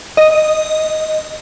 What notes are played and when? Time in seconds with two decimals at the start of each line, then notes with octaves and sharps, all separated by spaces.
0.17 D#5